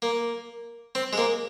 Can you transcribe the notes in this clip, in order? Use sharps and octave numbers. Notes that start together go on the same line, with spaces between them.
A#3
C4
G#3
A#3